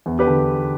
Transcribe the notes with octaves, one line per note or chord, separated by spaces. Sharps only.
E2
G4 B4
D3